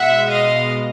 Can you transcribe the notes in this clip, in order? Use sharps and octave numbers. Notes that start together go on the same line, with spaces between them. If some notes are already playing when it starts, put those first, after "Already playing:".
Already playing: B2 G#3 E5 F#5
D#5 F5